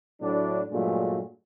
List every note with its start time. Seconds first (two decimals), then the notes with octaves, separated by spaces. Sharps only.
0.22 A2 F#3 D4
0.71 G2 A#2 F#3 G#3 A3 D4